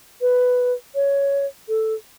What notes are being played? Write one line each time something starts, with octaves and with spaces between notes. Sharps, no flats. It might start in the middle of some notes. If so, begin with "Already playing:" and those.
B4
C#5
A4